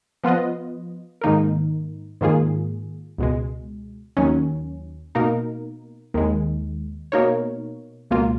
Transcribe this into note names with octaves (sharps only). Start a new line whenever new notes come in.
F3 B3 F4 B4 D#5
G#2 D#3 A#3 D#4 A#4
G#2 D#3 A#3 F4 G#4
C#2 B2 G#3
D#2 D#3 F#3 C#4
B2 A#3 D#4 A#4
D#2 D#3 G#3
B2 A#3 D#4 A#4 C#5
C#2 B2 A#3 F4